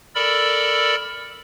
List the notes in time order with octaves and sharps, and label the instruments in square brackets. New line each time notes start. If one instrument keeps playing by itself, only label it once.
[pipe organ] A4 A#4 D5 B5 E6